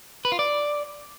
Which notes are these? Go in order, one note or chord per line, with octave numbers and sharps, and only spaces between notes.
B4
F4
D5